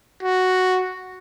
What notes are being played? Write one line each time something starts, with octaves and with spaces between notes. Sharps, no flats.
F#4